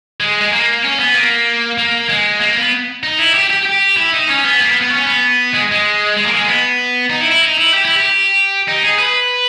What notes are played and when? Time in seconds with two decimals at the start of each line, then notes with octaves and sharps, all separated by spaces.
0.20 G#3
0.41 G#3
0.52 A#3
0.84 C#4
0.99 B3
1.15 A#3
1.78 A#3
2.09 G#3
2.40 A#3
2.56 B3
3.03 D#4
3.19 E4
3.34 G4
3.50 G4
3.66 G4
3.97 E4
4.13 D#4
4.29 C#4
4.44 B3
4.60 A#3
4.70 B3
4.81 B3
4.92 C#4
5.07 B3
5.54 G#3
5.72 G#3
6.17 G#3
6.26 A#3
6.36 G#3
6.48 B3
7.11 D#4
7.21 E4
7.32 E4
7.42 D#4
7.58 E4
7.74 G4
7.85 E4
7.97 G4
8.68 D#4
8.83 G#4
8.99 B4